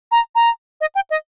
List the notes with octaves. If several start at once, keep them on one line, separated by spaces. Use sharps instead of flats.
A#5
A#5
D#5
G5
D#5